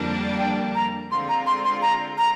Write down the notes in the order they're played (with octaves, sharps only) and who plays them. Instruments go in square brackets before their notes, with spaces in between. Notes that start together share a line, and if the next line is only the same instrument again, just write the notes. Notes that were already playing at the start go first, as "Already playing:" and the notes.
Already playing: [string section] F2 D3 G3 A#3 D4
[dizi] G5
A#5
[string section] D3 G#3 C4 F4 [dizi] C6
[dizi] A#5
C6
C6
A#5
A#5